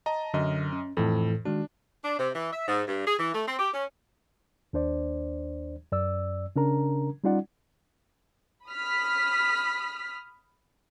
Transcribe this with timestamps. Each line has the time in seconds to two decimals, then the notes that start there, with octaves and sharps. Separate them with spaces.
0.06 D#5 A5 A#5
0.34 F#2 D3 D#5
0.73 C#4
0.97 F2 A2 E3 A4
1.45 D#3 G#3 D4 F#4
2.04 D4
2.19 C3
2.35 E3
2.52 E5
2.68 G#2
2.88 G2
3.06 G#4
3.19 E3
3.34 A3
3.48 C4
3.59 G4
3.74 C#4
4.73 D#2 D4 C5 D5
5.92 F#2 D5 E6
6.56 C#3 C#4 D4 A#4 A#5
7.24 G3 C#4 D#4 F4 D5 F#5
8.67 B5 D#6 F6 B6